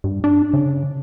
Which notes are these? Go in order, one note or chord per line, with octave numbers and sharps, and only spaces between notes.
G2
D4
C#3